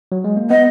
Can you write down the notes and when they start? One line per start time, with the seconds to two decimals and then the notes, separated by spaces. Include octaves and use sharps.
0.12 F#3
0.24 G#3
0.37 A#3
0.50 B3 D#5